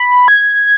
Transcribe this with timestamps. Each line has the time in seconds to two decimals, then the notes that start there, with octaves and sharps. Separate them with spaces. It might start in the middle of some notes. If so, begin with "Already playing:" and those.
Already playing: B5
0.28 G#6